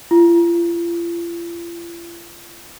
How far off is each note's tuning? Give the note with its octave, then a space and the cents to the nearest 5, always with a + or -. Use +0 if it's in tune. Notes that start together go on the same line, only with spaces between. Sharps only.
F4 -40